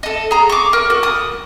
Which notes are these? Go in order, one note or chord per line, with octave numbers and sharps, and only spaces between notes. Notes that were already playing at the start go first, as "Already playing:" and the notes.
A4 D#5
G#4 A#5
C#6 D6
A#4
F#4
D#6